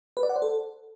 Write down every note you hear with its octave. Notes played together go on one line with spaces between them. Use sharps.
B4
D5
F#5
C5
A4